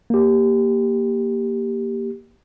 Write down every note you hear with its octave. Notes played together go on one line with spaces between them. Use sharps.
A#3 G4